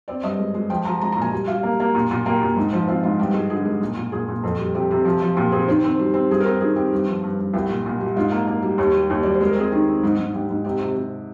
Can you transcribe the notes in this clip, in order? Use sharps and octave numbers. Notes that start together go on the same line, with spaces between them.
C4 D5
G2 D#5
G#3
G#3
F3 G5
F3 A#5
G#3 A#5
A#5
A#2 G#5
G3
G3 F5
A#3
A#3
A#2
A#2
A#3 G4
A#2
G#2
F3
C4 F4
G#2 F4
G2 G4
G#3
D3 G#4
G#3
A#2
A#2
A#2 G#4
A#2
F2
G3
C3 G4
C3
F3
F3
A#2 G4
C4 G#4
D#3 C5
C4
G3
C4
G2 G#4
A#4
C4 G4
D#3 G#4
C4 G4
G2
F3
G2
G2
C2 G4
A#2
A#2
G3
G#2 F4
A#3
A#3
G3
D#2 G4
G3
D#2
G3 D5
C5
G#3
A#4
C4 G#4
D#3 G4
C4
G#2
G#2
G#2 G4
G#2
C3 G4
C3
C3